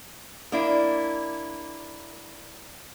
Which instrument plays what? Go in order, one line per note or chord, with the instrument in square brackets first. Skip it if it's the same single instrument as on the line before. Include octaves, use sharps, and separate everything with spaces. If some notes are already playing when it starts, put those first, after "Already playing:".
[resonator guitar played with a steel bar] A#3 D4 E4